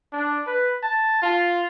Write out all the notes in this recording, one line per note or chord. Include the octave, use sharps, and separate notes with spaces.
D4
B4
A5
F4